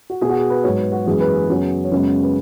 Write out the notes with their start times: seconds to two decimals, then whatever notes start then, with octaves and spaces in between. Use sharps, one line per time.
0.10 F#4
0.21 B2 B3 G#4
0.29 F#4
0.36 G#4
0.50 B4
0.64 G#2 F#3 B3 C#5
0.78 B4
0.92 F#4
1.06 F#2 E3 G#3 B3 G#4
1.20 B4
1.34 G#4
1.49 F#2 C#3 F#3 B3 G#4
1.84 C#5
1.91 F#2 C#3 G#3 B3 B4
2.23 B4